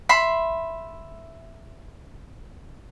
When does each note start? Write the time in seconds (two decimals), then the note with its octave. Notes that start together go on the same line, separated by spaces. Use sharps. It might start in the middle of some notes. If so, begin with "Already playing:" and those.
0.09 E5 B5 C6